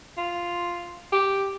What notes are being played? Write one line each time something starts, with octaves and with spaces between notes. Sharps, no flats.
F4
G4